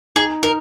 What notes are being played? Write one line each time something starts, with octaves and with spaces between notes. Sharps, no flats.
D#4 G#4
D#4 A#4